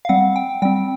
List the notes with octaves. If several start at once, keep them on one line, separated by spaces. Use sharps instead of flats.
F5
G3 C4 F#5
G5
G3 C4 G5